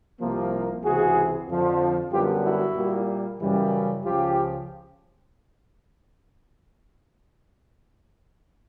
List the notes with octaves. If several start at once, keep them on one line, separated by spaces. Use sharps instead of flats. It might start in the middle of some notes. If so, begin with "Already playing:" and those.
C2 C3 F3 A#3
C#2 C3 E3 F#4 G#4
F2 D3 F3
F#2 D3 G3 B3 F4 G4
E4 F#4
A#2 G3 A#3
F#2 C#3 E3 G3
C#2 C#3 F3 F4 G4